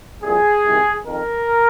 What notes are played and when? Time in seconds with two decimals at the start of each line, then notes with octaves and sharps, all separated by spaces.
0.23 C2 A#2 F3 G#4
0.64 C2 C3 D#3
1.05 F2 D#3 A#4